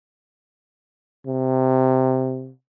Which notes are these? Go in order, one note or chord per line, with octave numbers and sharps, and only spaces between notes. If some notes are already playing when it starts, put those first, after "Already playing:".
C3